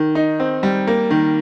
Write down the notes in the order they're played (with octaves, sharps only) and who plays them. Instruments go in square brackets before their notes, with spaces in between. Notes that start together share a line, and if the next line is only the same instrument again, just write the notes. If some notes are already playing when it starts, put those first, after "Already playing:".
Already playing: [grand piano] D#3
D#4
C4
G3
A#3
D#3